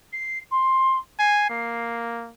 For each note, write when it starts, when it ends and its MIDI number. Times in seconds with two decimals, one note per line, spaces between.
0.12 0.38 96
0.50 0.98 84
1.19 1.45 80
1.19 1.96 96
1.50 2.31 58